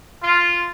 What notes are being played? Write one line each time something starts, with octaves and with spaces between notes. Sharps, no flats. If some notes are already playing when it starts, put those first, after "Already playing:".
F4